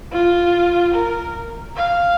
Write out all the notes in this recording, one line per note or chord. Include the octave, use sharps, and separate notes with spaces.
F4
A#4
F5